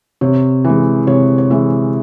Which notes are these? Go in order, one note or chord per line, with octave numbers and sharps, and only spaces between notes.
C3 C#5
E3
G#3
C3 C#5
C#5
E3 G#3 E5